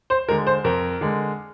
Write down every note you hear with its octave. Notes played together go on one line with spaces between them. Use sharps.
C5
D3 G#3 A#4
C5
F2 A#4
D3 G#3